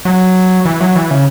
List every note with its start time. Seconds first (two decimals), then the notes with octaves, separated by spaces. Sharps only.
0.05 F#3
0.65 E3
0.81 F#3
0.96 E3
1.11 C#3